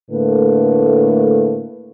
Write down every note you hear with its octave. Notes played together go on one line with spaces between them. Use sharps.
A2 D3 A3 A#3 B4